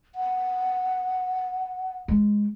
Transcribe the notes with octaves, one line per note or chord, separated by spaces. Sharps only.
F#5
G#3